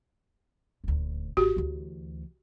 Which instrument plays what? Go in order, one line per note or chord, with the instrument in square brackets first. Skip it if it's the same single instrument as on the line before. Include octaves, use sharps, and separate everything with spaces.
[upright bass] D#1 D2
[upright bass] G#1 [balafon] F#4 G4
[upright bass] D2 E3